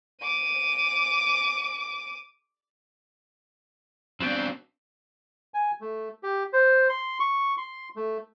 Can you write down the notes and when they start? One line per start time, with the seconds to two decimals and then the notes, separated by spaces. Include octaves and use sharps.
0.22 D6 D#7
4.20 B3 C4 D4 F#4 G5
5.54 G#5
5.81 A3
6.23 G4
6.53 C5
6.89 C6
7.20 C#6
7.57 C6
7.96 A3